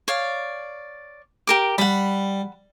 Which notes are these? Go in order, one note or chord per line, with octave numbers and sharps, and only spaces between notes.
C#5 D5 F5
G4 A#4 D6
G3 F#5 B5